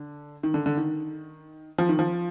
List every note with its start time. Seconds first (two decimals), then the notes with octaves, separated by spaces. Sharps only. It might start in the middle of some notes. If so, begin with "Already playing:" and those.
Already playing: D3
0.43 D#3
0.54 D3
0.66 D3
0.77 D#3
1.78 F3
1.89 D#3
1.99 F3